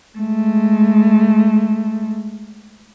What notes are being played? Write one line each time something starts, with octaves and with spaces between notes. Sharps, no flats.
G#3 A3